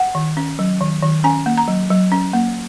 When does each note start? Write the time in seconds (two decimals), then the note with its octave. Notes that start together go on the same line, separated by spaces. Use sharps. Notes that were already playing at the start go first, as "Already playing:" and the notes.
Already playing: F#5
0.15 D#3
0.37 C#4
0.59 F#3
0.81 D#3
1.03 D#3
1.24 C#4 G#5
1.46 A#3
1.57 A#5
1.68 F#3
1.90 F#3
2.12 C#4
2.33 A#3